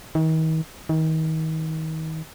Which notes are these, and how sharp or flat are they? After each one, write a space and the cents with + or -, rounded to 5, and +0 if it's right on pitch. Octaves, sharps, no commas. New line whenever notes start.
D#3 +40
D#3 +35